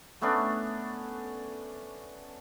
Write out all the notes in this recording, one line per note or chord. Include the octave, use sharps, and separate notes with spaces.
A3 B3 C#4 D4